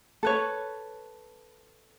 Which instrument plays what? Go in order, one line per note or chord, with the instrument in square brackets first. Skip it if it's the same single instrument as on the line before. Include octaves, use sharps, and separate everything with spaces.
[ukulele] A4 B4 C#5